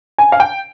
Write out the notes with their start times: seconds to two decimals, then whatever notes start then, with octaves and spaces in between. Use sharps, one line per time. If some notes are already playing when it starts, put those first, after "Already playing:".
0.18 G#5
0.32 F5
0.40 G5